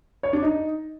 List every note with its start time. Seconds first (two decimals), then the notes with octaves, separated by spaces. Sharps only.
0.23 C#5
0.33 D4
0.43 D#4